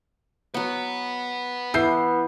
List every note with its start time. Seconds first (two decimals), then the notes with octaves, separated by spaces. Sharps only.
0.54 F#3 B3 B4 F#5
1.74 E3 B3 E6 G6 C7